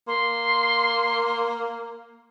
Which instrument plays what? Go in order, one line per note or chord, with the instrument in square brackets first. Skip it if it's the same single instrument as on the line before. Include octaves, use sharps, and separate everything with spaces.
[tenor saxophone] A#3 [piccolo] C6